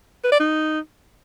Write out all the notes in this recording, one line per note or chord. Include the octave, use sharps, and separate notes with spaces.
B4
D5
D#4